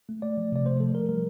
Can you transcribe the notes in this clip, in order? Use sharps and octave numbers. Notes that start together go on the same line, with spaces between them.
A3
A3 D5
F3
C3 D5
A3 C5
F3 A4
F3 A#4
G3 A#4